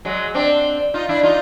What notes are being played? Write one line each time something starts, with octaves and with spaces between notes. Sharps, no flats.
F#3 G#3
C4 D4
D#4 F4
D4 E4
D#4 F4